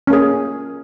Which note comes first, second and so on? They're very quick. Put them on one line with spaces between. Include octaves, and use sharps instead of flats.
C#4 A#3 G#4